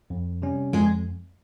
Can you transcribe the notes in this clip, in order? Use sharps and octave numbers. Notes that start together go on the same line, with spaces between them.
F2
C3 G3 C#4
F2 G#3 G#4